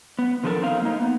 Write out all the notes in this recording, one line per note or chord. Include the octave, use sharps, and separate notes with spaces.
B3
D3 F3 F#3 F4 A4 A#4
C4 D#4 F5
A#3 D#4
B3